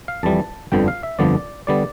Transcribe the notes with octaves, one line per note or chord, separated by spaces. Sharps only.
F5
F2 E3 G3 A5
G1 F2 D3 F3 B3 G5
F5
E5
G1 F2 D3 F3 B3 D5
D3 G3 B3 D5